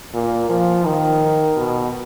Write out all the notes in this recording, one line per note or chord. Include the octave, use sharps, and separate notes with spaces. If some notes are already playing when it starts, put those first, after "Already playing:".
A#2
F3
D#3
B2